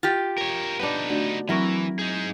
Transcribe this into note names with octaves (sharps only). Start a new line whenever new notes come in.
F4 G4
A#4 C#5
B3 D4 D#4 B4
D3 A3 F#4
E3 F#3 C4 E4 A#4 C#6
D#4 G#4